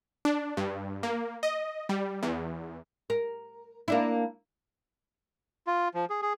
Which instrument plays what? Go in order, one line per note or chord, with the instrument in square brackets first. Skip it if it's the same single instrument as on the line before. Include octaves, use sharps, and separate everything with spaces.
[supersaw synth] D4
G2
A#3
D#5
G3
E2
[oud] A#4
A#3 D4 E4
[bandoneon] F4
F3
G#4
G#4